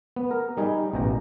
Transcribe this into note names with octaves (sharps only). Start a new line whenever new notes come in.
B3
A#4
G3 D#4 G#4
A1 B2 G5 A#5